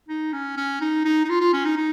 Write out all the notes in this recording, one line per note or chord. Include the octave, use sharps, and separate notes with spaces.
D#4
C#4
C#4
D#4
D#4
D#4
F4
F4
C#4
D#4
D#4